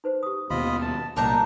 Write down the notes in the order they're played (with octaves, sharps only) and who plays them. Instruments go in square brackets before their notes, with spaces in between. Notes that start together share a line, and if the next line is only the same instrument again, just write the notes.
[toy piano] D#4 B4 C5
G4 D#6
[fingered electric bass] D#2 B2 [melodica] F4 D#5 B5
[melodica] A5
[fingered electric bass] C2 A#2 [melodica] D4 D#4 G4 [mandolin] A#4 A5 A#5